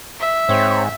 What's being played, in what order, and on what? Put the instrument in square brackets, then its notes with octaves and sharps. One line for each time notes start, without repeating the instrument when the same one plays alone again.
[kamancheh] E5
[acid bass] G#2 [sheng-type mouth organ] C4 C#5